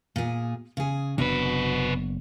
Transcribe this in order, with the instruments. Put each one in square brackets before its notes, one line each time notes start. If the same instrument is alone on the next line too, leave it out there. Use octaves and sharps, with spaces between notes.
[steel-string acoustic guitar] A#2 G#4
C#3 G#4
[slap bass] F#1 B3 D4 [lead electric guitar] C3 B4 [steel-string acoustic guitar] F#4